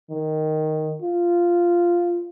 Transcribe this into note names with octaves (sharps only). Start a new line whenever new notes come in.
D#3
F4